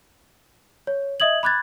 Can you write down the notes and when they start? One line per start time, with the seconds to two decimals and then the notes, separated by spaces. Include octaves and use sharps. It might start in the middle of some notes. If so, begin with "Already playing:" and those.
0.87 C#5
1.20 D#5 E5 D#6 G#6 F#7
1.43 B5 D6 F#6 G#6 A6